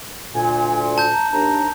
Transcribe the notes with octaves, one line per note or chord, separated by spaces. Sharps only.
D2 A#2 G#5
A5 G6
A#5
D#2 D4 A#5